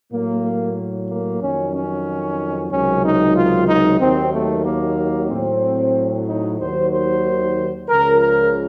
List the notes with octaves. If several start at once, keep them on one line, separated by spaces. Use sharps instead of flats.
A2 F#3 A#3
A#3
F2 D#3 F#3 C#4
C#4
C#2 C3 D#3 F#3 C#4
D#4
F4
D#4
D#2 D#3 F#3 C4
A3
A#3
A2 F#3 C4
D#4
D#2 D#3 F#3 C5
C5
C#2 C#3 F3 A#4
A#4